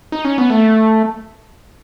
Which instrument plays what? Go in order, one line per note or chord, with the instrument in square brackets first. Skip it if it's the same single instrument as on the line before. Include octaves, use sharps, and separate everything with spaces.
[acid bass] D#4
C#4
B3
A3